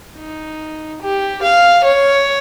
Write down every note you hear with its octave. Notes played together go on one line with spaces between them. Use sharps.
D#4
G4
F5
C#5